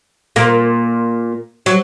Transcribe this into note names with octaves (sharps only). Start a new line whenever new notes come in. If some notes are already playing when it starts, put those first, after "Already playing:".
A#2 A#3
F#3